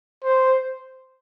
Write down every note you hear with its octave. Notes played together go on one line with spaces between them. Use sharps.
C5